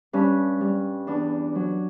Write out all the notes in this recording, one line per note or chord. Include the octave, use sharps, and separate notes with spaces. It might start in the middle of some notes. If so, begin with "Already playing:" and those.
G2 C#4
G3
E2 D4
F#3